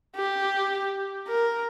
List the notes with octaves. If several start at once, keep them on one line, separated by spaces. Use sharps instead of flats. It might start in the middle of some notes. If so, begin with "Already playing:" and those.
G4
A#4